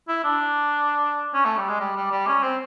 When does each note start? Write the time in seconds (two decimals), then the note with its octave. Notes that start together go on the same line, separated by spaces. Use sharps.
0.08 E4
0.24 D4
1.34 C#4
1.45 A3
1.57 G3
1.69 G#3
1.80 G3
1.96 G3
2.11 G3
2.27 C#4
2.43 C4